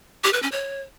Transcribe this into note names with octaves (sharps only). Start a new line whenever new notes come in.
G4
B4
C#4
C#5